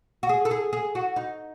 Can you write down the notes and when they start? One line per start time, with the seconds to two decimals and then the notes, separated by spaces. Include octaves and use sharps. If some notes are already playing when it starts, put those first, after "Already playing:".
0.23 F#4
0.29 G#4
0.45 A4
0.51 G#4
0.73 G#4
0.95 F#4
1.16 D#4